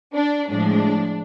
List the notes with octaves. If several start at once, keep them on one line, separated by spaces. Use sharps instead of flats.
D4
A2 F3 G#3 D4